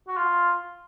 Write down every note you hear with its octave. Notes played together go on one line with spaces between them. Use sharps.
F#4
F4